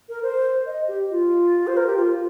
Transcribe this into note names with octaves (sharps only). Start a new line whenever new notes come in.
A#4
C5
D#5
G4
F4
C5
A#4
G4
F4